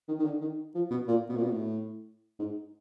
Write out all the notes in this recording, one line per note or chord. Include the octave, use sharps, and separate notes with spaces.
D#3
D#3
D3
D#3
F3
B2
A#2
B2
A#2
B2
A2
G#2